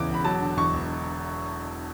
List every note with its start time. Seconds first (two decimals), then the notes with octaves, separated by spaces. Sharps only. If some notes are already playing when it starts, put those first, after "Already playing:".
Already playing: E2 C#3 E3 D6
0.09 E1
0.14 B5
0.25 F#3 A5
0.41 D3
0.57 E2 C#6
0.73 E1